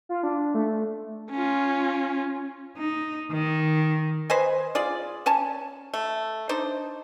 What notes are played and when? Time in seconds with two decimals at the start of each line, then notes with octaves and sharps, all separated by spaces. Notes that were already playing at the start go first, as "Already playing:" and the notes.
0.09 F4
0.23 D4
0.55 A3
1.31 C#4 F4
2.77 D#4
3.32 D#3
4.30 B4 C5 D#5 G#5
4.75 F4 G#4 D5
5.26 C#4 G#5 A5
5.94 A3
6.49 D4 D#4 C5